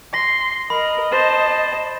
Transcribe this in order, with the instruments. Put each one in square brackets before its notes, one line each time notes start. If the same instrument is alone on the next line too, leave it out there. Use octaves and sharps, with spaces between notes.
[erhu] C6 [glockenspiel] A#6
[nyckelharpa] A#4 [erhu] D#5 [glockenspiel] B5
[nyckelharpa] C5 A5